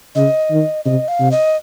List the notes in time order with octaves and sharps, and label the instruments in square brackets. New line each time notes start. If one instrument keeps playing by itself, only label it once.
[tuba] C#3 [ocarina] D#5
[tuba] D#3
[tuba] C3 [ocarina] D#5
[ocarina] F5
[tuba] C3
[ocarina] D#5